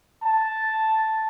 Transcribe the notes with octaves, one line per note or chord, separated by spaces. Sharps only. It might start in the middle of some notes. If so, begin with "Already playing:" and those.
A5